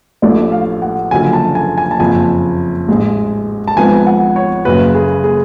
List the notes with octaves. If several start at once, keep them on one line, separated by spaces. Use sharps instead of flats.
A1 A2 F3 A3 D4 D5
F5
F#5
F#1 F#2 D3 F3 G#5
A5
G#5
G#5
A5
F#1 F2 F3 G#5
A1 G#2 G#3
A5
G#1 G#2 F3 B3 G#5
F#5
C#5
F#1 F#2 C#3 B4
G#4
G#4